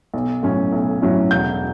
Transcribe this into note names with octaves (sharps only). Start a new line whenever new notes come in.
B1
A2 F#3 C#4 E4
B1
A2 F#3 C#4 E4
E1 G6